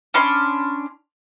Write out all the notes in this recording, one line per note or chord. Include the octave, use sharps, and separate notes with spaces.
C#4 D4 B5 C6